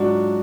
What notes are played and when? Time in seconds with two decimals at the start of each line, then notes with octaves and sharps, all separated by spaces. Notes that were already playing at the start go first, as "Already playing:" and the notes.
Already playing: G#2 F#3 D4 F4 F#4